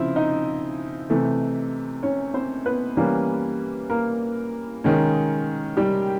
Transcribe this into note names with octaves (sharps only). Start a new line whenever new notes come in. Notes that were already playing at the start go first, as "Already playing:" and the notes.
Already playing: C#3 F3 C4 E4 E5
D#4 D#5
C3 E3 A3
C#4 C#5
C4 C5
B3 B4
E3 G3 A#3 C#4
A#3 A#4
D#3 G#3 C#4
G3 G4